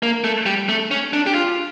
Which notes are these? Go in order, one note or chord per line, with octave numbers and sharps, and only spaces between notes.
A#3
A3
G3
A3
C#4
D4
G4
F4